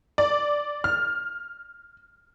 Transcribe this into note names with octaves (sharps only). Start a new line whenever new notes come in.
D5
F6